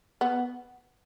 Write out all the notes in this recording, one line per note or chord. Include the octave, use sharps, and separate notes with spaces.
B3